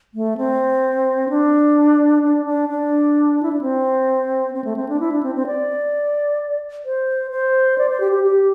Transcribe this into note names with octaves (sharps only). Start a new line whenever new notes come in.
A3
C4
D4
D4
D4
D4
E4
D4
C4
C4
A3
C4
D4
E4
D4
C4
C4
D5
C5
C5
D5
C5
G4
G4
G4